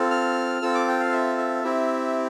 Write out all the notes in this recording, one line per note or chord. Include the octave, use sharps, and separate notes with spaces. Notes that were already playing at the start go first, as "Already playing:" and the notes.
Already playing: C4 F4 A4
F6
C4 F4 A4 E6
D6
G5
F5
E5
E5
C4 E4 G4